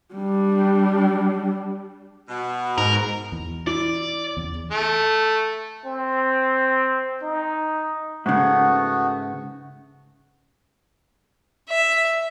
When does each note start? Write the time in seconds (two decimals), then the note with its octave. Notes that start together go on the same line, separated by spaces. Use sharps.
0.14 G3 D4
2.28 B2
2.78 G#2 A#4
3.32 E2
3.67 E4 D5
4.37 E2 C#3
4.71 A3
5.85 C4
7.22 D#4
8.26 G#2 C#3 A3 B3 F#4
11.70 E5